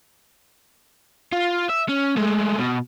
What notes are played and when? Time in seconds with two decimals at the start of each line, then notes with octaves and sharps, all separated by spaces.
1.33 F4
1.70 E5
1.89 C#4
2.17 G#3 A3
2.59 B2